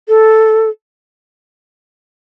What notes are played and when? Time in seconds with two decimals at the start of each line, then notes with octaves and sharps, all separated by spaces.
0.08 A4